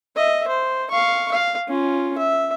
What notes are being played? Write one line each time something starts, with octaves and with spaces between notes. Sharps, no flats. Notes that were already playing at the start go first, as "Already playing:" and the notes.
D#5 E5
C5
F5 C#6
F5
C#4 F4
E5